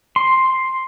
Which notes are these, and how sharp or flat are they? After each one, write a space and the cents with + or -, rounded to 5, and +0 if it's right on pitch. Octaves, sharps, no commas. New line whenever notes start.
C6 +5